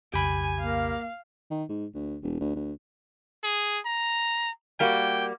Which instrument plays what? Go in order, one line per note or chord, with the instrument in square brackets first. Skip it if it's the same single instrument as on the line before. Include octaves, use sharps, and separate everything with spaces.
[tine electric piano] B1 F2 C#3 [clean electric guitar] G4 B5 [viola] G#5
[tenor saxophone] A#3 [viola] F5
[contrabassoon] D#3
G#2
D2
E1
D2
D2
[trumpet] G#4
A#5
[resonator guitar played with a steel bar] G3 A#3 F#4 [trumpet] G5